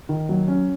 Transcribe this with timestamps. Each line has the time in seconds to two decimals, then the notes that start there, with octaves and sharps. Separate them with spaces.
0.09 D#3
0.29 F#3
0.48 C#4